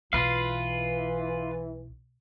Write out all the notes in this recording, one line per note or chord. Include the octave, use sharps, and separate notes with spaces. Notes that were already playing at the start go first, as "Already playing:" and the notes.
B1 E3 F4 B4 F5